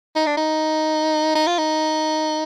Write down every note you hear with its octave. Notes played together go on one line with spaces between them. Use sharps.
D#4
D4
D#4
D#4
F4
D#4